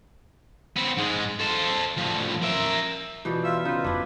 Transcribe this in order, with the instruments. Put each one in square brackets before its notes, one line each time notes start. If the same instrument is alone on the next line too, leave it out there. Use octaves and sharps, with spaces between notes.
[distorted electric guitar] B3 C4
G#2 G#3
A4 C5
A2 F3
A#4 E5
[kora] B2 F3 G3 [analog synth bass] E3
[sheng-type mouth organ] F4 E5 E6
[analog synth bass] C#3 [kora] D#4 [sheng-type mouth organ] F4 B4
[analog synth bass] F1 [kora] D4 E4